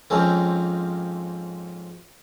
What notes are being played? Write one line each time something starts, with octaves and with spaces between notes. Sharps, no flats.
F2 G#2 F3 C4 C#4